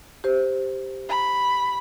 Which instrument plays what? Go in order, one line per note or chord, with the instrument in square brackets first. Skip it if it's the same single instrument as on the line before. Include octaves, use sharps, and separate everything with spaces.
[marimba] G4 C5
[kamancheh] B5